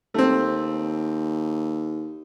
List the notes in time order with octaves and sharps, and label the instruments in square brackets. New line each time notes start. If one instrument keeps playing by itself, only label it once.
[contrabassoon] D#2 [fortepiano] A3 C4